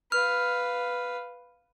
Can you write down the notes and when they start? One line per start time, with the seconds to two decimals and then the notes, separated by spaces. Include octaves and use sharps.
0.12 B4 F5 F6